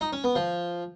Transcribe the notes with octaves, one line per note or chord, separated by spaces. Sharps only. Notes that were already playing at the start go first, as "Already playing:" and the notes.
D#4
C#4
B3
F3